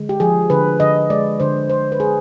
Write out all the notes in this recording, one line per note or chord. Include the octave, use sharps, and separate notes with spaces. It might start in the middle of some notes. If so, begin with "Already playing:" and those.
Already playing: D3 G#3
G4
F3 G#4
D3 B4
D3 D#5
G#3 D5
D3 C5
D3 C5
B4
G#3 G#4